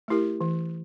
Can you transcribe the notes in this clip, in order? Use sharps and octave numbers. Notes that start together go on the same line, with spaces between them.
A3 E4 G4 A#4
E3